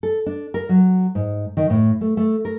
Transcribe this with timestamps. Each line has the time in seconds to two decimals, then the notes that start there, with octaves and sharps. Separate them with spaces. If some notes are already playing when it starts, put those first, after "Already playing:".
0.03 A4
0.26 D4
0.54 A#4
0.69 F#3
1.15 G#2
1.57 D#3
1.70 A2
2.01 A3
2.17 A3
2.45 A#4